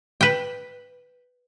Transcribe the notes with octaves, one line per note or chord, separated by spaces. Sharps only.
B4 G5